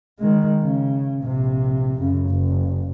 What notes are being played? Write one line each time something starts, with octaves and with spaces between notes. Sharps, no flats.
D#3 G#3
C#3
A#1 C3
F#2 C#3
F#1